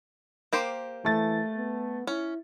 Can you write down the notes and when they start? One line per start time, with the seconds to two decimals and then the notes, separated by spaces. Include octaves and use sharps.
0.53 A#3 G4 C5
1.05 E3 A3 A6
1.57 B3
2.07 C#4 E4